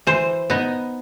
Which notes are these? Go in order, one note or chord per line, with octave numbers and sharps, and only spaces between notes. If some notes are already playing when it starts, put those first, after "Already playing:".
E3 C5
B3 D#4